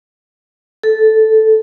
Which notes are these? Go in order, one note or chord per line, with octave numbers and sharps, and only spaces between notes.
A4